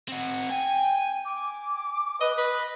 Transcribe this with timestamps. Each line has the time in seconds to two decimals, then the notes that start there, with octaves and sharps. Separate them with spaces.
0.09 C4 F#4
0.50 G5 G#5
1.25 D6
2.21 B4 D#5
2.37 B4 D#5